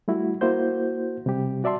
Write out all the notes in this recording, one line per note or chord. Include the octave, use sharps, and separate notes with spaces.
G3 A3 E4 F#4
A#3 E4 F#4 C5 G6
C3 G3 G4
F#4 D5 E5 A5 C6